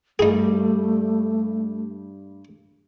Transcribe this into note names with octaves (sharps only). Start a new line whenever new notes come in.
G2 G3 A3 A#3 D#4 G#4